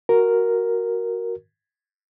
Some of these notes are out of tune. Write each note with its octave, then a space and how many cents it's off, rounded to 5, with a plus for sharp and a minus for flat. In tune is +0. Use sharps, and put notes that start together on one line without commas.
F#4 +0 A#4 +0